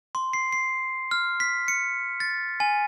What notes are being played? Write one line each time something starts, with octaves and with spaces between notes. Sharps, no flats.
C6
C7
C7
F6
B6
C#7
A6
G#5